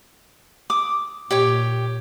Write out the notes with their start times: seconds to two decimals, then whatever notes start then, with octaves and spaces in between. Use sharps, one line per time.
0.70 D6 D#6
1.31 A#2 G4 C#5 C#6